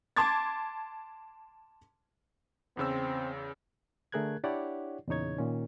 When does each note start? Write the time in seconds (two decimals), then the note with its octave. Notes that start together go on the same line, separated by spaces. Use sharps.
0.16 A5 C6 D6 G#6 A6
2.77 E2 C#3 C4 E6
4.12 D3 A3 G#4 A#4 F#6 G#6
4.44 D4 E4 G4 C#5 D5 F#5
5.08 E2 A#2 C#3 D#4 C#5 G#6
5.38 A#2 D#3 C#4